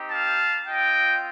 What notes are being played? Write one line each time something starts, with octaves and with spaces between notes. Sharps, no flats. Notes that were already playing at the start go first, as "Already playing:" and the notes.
Already playing: C4 D#4 G4
F5 A5
C4 F4 D#5 G5